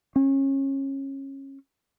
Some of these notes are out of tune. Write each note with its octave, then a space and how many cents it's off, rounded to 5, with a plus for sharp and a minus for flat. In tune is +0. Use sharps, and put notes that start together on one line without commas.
C#4 -25